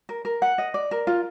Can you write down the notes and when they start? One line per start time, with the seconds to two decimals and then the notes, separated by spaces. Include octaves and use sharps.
0.09 A#4
0.25 A#4
0.42 F#5
0.58 D#5
0.74 D5
0.91 A#4
1.07 F4